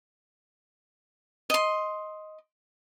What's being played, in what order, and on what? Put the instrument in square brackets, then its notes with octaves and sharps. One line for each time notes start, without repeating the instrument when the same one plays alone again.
[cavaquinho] D#5 C6